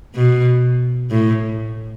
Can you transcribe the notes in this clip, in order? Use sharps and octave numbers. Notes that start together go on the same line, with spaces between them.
B2
A2